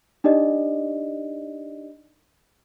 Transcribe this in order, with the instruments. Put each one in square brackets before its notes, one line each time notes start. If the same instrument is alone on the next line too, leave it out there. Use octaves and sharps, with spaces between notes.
[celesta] D4 D#4 G4 D5 D#5